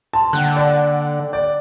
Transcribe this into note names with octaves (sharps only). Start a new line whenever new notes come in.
A5 C6
D3 A#3 F#5 G5 F#6
D5
D5